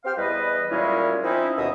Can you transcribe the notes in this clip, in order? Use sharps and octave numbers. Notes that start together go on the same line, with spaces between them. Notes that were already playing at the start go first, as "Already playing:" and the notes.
C4 G4 C5 F5 G5 F6
E2 E3 G3 B4 D#5
F#2 A#2 G3 G#3 C#4 E4
F3 C4 C#4 D#4 E4
D#2 B2 D#5 E5 D#6